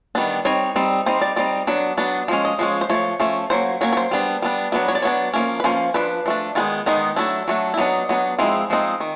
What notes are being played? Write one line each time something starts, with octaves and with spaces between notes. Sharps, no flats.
D#3 G3 B3 D4
G3 C4 D#4 C#5
G3 C4 D#4
G3 C4 D#4 C5
D5
G3 C4 D#4 D5
F#3 B3 D4
F#3 B3 D4
F3 G#3 C#4
D#5
F3 G#3 C#4
C5
F3 A3 C#5
F3 A3 C#4
F#3 A#3 C#4 C5
F#3 A#3 C#4 C#5
C#5
C5
G3 B3 D4
G3 B3 D4
F#3 B3 D4 B4
C#5
D5
F#3 B3 D4 C#5
F3 A#3 C#4
B4
F3 A#3 C#4 C5
F3 A3 D4 B4
F3 A3 D4
D#3 G#3 B3 D#4 F4
D#3 G#3 B3 D#4
F#3 A3 D4 E4
F#3 A3 D4
E4
F#3 B3 D4 D#4
F#3 B3 D4
F3 G#3 C4 D#4 E4
F3 G#3 C4 D#4
D#3